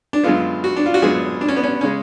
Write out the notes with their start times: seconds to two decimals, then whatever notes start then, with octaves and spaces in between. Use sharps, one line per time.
0.13 D4
0.23 F#2 D3 G#3 B3 F4
0.64 F#4
0.77 D4
0.86 F4
0.94 F#4
1.02 F#2 D3 G#3 B3 G#4
1.41 D4
1.48 C#4
1.57 B3
1.64 C#4
1.81 C#3 G#3 C#4